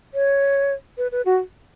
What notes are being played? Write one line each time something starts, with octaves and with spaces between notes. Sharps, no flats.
C#5
B4
B4
F#4